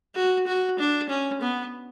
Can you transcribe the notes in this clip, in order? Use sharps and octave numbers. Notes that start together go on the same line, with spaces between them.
F#4
F#4
D4
C#4
B3